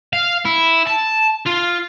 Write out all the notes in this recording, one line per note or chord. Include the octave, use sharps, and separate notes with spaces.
F5
E4
A5
F4